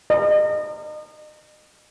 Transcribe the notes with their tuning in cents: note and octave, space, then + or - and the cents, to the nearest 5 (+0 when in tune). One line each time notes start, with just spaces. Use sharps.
D#5 -35